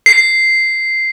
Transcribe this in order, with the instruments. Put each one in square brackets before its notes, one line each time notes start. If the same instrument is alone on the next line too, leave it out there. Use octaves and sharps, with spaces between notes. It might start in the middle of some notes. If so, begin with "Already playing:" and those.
[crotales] C7